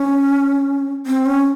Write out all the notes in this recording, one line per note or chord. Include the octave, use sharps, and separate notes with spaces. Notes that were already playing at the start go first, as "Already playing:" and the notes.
Already playing: C#4
C4
C#4